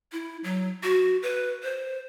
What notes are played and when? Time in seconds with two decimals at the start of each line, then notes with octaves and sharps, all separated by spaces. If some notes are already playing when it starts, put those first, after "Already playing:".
0.12 E4
0.44 F#3
0.84 F#4
1.23 B4
1.63 C5